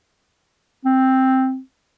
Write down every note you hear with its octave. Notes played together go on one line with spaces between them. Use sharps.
C4